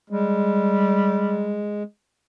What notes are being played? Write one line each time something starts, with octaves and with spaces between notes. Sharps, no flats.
G3 G#3